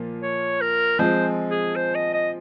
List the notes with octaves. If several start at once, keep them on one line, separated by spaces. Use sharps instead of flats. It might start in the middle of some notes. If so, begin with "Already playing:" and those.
Already playing: A#2 F3 A#3
C#5
A#4
F3 G#3 C4 C5
G#4
C5
D#5
D#5